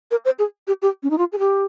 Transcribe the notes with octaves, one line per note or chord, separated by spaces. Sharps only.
A#4
C5
G#4
G4
G4
C#4
D#4
F4
G#4
G4